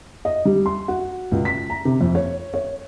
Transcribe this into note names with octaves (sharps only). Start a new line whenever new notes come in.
D#5
G3
C6
F#4
C#2
B6
A#5
C3
F2
C#5
C#5